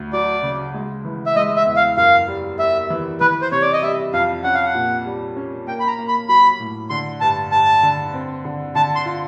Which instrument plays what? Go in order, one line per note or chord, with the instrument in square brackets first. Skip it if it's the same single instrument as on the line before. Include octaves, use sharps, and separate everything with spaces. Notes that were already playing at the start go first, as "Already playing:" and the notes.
Already playing: [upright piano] D2
[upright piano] F#3 [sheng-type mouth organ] D5
[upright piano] C#3
G#3
E3
[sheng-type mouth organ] E5
[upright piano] G#3 [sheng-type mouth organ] D#5
[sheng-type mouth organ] E5
[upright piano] E2
[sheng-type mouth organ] F5
[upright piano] F#2 [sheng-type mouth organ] F5
[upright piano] G3
[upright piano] G3 [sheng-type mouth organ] E5
[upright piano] E3
[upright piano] E3 [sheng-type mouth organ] B4
[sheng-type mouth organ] C5
[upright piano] C3 [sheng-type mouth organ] C#5
[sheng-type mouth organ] D5
D#5
[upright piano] G3 [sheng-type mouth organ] E5
[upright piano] F2 [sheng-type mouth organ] F5
[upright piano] C#4 [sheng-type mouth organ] F#5
[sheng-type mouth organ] F5
F#5
[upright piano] A#2
G3
C#4
[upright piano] A#3 [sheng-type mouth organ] G5
[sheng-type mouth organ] B5
A#5
[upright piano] A#3
[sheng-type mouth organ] B5
[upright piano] F#3 [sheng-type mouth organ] B5
[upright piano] A2
[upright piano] D3 [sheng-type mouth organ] C6
[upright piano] G2 [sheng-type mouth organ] A5
[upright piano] G2 [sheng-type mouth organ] A5
[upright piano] D3
C4
D3
[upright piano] D3 [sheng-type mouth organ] A5
[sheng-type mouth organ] C6
[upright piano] F4